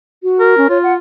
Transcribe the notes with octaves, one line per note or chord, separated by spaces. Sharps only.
F#4
A#4
C#4
F4 C#5
F#5